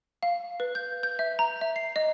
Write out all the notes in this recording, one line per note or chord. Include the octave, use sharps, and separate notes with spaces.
F5
B4
G6
G6
E5
A#5
E5
C7
D#5